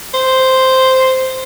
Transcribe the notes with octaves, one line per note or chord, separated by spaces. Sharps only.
C5